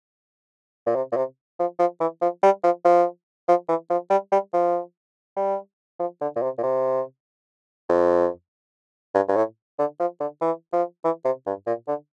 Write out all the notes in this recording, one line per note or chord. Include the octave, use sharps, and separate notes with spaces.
A#2
C3
A#2
C3
F3
F3
E3
F3
G3
F3
F3
F3
E3
F3
G3
G3
F3
G3
F3
D3
A#2
C3
A#2
C3
F2
G2
G2
A2
D3
F3
D3
E3
F3
E3
C3
G2
A#2
D3